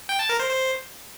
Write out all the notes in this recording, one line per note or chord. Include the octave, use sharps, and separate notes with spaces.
G5
A5
A#4
C5
C5